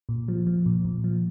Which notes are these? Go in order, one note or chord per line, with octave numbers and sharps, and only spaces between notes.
A#2
F3
F3
A#2
A#2
F3